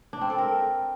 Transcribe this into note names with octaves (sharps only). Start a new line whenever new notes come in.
D4
C4
A4
A#4